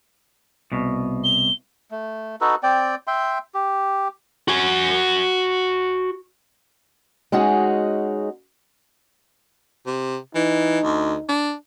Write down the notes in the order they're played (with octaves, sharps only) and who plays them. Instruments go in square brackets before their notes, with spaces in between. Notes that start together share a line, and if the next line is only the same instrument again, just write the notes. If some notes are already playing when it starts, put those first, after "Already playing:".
[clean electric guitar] C2 B2
[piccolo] G7
[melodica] A3
D#4 F#4 A4 B4
C4 D5 G5
E5 G5 C6
G4
[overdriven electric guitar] F#4 G#5
[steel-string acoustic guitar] G#3 C#4 D#4 F#4 G#4
[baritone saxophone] C3
[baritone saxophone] E3 [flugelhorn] D#4
[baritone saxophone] D2
D4